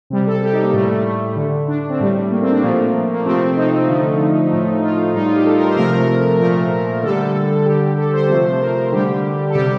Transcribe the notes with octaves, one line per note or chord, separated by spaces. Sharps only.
C3 G3
A4
G4
D#4
A#3
A2 G3 A3
A3
A3
D3 A3
D4
D4
C4
A2 G3 A3
A#3
C4
D4
A#2 F3 A3 A#3
A#3
C3 F3 A3 C4
D#4
D3 F3 A3
A2 F3 A3
F4
A2 G3 D#4
F4
G4
A4
A#4
C5
C3 F3 A3 A#4
A#2 F3 A3 A#4
D3 G3 A4
D3 G3 G4
A4
C5
C3 F3 A3
A#4
D3 G3 G4
A4
C3 G3 G4